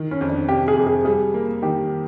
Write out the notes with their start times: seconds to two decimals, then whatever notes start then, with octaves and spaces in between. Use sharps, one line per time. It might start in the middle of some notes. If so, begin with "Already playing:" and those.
Already playing: D#3
0.11 C#4
0.21 F2
0.30 D4
0.49 C3 G4
0.68 G#4
0.77 F2
0.87 G#4
1.05 G3 G#4
1.34 A#3
1.62 D#3 G4